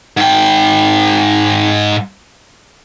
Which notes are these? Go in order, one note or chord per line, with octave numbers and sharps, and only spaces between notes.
G#2 G5